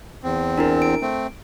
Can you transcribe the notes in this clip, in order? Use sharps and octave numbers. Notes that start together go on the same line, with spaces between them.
E2 C4
D4 E4 A#4
D7
A3 C4